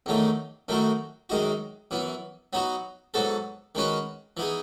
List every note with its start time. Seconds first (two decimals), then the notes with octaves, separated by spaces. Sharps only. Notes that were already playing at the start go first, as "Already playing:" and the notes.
0.06 E2 D#3 F#3 A3 D#4
0.68 F#2 D#3 A3 D#4 F#4
1.29 F#2 D#3 G#3 D#4 F#4
1.91 F#2 E3 B3
2.53 F#3 B3 D#4 F#4
3.14 G#2 F#3 B3 F#4 A4
3.75 D#3 G#3 C#4 F#4 B4
4.37 E3 B3 D#4 G#4